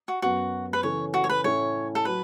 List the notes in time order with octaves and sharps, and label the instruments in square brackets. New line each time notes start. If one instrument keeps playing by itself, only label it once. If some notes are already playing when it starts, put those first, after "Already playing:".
[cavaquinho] F#4
[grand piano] F#2 F#3 B3 [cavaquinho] F#4
[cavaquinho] B4
[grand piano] C#3 E3 C#4 A4 [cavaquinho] C#5
[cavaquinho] F#4
C#5
B4
[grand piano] A2 A3 C#4 E4 A4 [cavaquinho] C#5
[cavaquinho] A4
[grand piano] F#3 [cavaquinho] B4